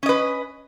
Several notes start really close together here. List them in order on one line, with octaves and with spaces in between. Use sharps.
C#4 D#5 B4